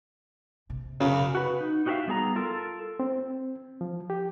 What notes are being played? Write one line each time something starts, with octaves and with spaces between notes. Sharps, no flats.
A#1 C3
F#2 C#3
F#4 B4
D#4
D#4 F#4 G4 A#4 E5 F5
G3 B3 G#4 G#5 A#5
F4 A4 A#4
C4
F3
G4